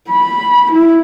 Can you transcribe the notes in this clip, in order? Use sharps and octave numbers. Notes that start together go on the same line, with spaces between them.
B5
E4